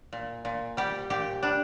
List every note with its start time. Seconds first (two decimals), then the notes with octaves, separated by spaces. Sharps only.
0.13 A#2
0.45 A#2
0.77 G3 G4
1.10 A#2 G4
1.43 G3 D4